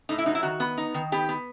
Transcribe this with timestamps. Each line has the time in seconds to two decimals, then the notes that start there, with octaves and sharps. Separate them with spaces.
0.09 A2 D#4
0.18 E4
0.26 F#3 D#4
0.35 E4
0.43 D#3 F#4
0.60 B3
0.78 D#4
0.94 D#3
1.12 B3 G4
1.29 B3